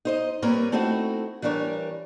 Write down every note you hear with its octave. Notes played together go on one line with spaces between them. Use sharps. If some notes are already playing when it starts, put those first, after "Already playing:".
D#4 C5 D#5
G3 A#3 C4 A#4 B4 C#5
A3 C4 D#4 E4 F#4
E3 G3 D4 A#4 C#5